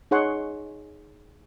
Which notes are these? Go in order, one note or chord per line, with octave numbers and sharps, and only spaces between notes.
D#4 G#4 C#5 F#5 C6